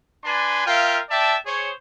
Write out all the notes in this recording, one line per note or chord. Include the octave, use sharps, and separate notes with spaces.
D4 B4 D5 G#5 C6
F4 A#4 E5 F5 G5
D5 E5 G5 A5
G#4 C5 C#5